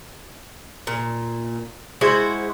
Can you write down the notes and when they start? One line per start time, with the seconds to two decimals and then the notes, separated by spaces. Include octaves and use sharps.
0.87 A#2
2.01 G#3 E4 F#4 C5